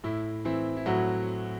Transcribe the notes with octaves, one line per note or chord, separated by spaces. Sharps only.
A2 E4
E3 C4 E4
E4
A2 F#3 F#4